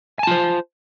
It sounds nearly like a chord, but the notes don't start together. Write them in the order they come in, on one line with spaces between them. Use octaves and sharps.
G#5 A5 F4 C5